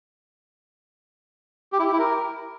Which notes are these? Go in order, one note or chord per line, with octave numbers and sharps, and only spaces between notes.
G4
E4
G4
E4
A#4